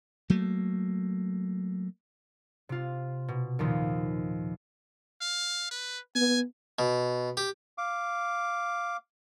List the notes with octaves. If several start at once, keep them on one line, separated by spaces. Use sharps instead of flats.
F#3 A3 A#3
C3 F4
B2
D#2 A#2 D#3 F3
F5
B4
B3 G#5
B2
G4
F5 D6